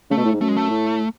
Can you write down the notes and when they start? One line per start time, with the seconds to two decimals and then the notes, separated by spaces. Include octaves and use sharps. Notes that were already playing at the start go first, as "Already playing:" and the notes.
0.10 C#3 A3
0.17 B2
0.25 A2
0.33 G#2
0.41 F#2 A3
0.49 G#3
0.57 A3
0.70 A2